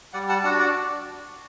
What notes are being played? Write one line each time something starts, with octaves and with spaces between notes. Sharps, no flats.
G3 D5 F#5
F#5 A5
D4 F#4 F#5 A5
D5 F#5